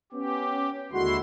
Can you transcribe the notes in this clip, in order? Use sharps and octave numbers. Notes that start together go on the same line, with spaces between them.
B3 C#4 G4
D#2 D3 G#3 E4 F#4 C6